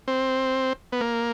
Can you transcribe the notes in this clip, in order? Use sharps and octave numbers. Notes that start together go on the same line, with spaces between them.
C4
B3
A#3